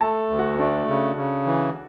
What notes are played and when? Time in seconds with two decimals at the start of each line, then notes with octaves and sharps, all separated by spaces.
0.01 A3 A4 A5
0.30 D2
0.39 F#4 F#5
0.58 A3 D4 D5
0.88 C#3
1.16 C#3
1.46 E3